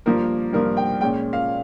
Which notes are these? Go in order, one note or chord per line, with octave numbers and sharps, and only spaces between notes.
G2 F3 A#3 A#4
G2 F3 A#3 A#4
G5
A#2 G#3 C#4 G5
F5